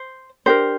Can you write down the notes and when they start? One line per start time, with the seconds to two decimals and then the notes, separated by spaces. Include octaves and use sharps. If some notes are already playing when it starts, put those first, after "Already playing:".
Already playing: C5
0.46 D4 G4 A#4 C5